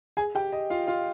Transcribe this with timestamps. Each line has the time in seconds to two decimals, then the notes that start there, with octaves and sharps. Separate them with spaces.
0.17 G#4 G#5
0.35 G4 G5
0.52 D#5
0.70 F4 F5
0.87 F4 F5